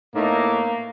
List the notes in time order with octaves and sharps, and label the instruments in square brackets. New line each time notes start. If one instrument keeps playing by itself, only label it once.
[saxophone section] A2 B3 D#4 [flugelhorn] A#3